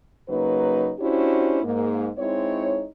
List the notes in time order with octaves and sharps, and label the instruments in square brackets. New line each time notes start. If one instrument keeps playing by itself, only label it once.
[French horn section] C#3 F#3 A#3 D#4 B4
C#4 D4 E4 F#4 G4 C5
G#2 A#3
G#3 C4 D#4 E4 C#5